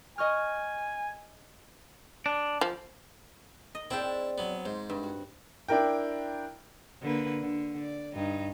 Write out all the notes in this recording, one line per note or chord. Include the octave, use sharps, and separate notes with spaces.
D#5 G#5 C#6 F6
D4
F3
D#5
C4 D4 E4 G#4 G5 A5
F#3 B3
G#2 C5
G2
F#4
D4 E4 A#4 G5
D3 A#3 B4
D3
D5
G2 D#4